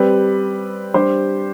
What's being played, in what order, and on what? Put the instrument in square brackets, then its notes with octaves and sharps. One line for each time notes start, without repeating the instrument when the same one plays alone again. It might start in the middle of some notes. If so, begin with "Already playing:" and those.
Already playing: [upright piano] G3 C4 G4 B4
G3 D4 G4 C5